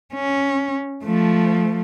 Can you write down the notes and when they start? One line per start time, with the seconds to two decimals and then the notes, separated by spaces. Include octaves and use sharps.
0.14 C#4
1.04 F3 A3